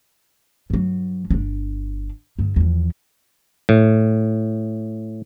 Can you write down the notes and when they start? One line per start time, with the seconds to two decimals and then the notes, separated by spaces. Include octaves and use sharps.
0.70 G2 F#3
1.31 G1 D4
2.39 G2 D3
2.56 E2 F3
3.69 A2